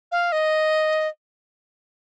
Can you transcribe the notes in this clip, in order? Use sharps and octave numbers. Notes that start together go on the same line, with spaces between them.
F5
D#5